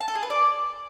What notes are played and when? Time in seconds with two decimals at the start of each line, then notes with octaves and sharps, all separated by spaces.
0.01 A5
0.08 A4
0.15 G#4
0.23 B4
0.30 D5